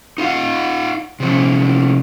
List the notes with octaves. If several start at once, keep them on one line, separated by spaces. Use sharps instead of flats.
D#4 F4 F5 F#5
C3 F3 C#4